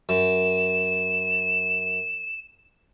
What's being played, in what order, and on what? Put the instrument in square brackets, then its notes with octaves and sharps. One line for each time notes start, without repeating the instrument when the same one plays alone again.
[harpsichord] F#2 [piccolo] E7